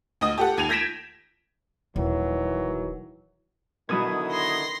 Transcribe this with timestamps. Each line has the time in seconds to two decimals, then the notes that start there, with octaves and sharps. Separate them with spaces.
0.21 D2 D#5 D#6
0.38 G4 A4 F#5
0.57 D#2 G#6 D#7 F7
0.69 G6 G#6 A#6 B6 D7 E7
1.96 D#1 D#3 E3 F#3
3.89 B2 D3 D#3 F#3 E4 B5 D#6 G#6
4.32 C6 A#6